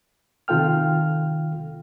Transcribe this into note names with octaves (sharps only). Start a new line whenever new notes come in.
C3 D#3 F4 A4 G5 F6